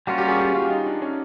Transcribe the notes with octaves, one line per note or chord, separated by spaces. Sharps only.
G3 A#3 C#4 F4 F#4
G4
G#4
G4
F4
D#4
D4
C#4